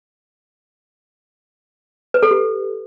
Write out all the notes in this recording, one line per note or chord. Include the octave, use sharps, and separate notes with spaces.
B4
A4
G4